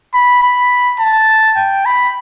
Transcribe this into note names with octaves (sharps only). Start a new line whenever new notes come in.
B5
B5
A5
G5
B5